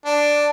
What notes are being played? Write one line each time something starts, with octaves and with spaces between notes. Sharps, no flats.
D4